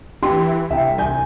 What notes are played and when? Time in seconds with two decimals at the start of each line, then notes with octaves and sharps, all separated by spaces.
0.23 E3 G4 C6
0.71 C2 E5 G5
0.98 G#5 G6